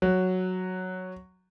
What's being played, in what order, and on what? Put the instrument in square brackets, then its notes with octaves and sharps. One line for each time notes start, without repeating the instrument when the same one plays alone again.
[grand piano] F#3